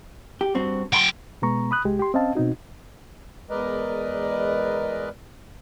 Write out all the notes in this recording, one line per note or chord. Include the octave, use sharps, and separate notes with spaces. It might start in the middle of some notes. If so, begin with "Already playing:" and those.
G4
G2 C4 F#4
F#3 F#5 G5 B5 C6
B2 G#3 B3 A#5 C#6
B5 D#6 F#6
C2 G#3 G4
G4 C6
C4 C#4 D#5 F5 A5
B2 C4 D#4 F#4
E2 G#3 A#4 B4 D5 D#5